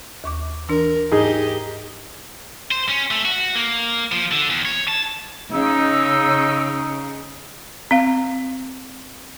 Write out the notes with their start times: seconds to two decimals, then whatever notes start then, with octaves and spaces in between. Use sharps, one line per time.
0.24 D#2 C#6 D6
0.69 E3 D4 A#4
1.12 G#2 D#4 G4 G#4 D#5
2.71 C5
2.88 C#4
3.11 A3
3.25 F#4
3.55 A#3
4.12 F3
4.31 D3
4.50 E2
4.66 C#5
4.88 A5
5.52 C#3 D#4 E6
7.91 C4 F5